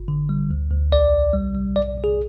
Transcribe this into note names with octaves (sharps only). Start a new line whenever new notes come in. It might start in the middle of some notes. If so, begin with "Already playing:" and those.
Already playing: G1
D3
G3
D2
D2
B1 D5
B1
G3
G3
B1 D5
B1
G#4